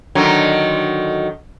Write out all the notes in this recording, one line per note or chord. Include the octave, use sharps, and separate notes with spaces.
D3 D#3 F#3